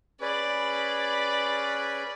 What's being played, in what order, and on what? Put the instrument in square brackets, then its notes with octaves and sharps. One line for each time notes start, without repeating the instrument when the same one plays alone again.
[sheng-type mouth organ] C#4 G#4 B4 [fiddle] D5 B5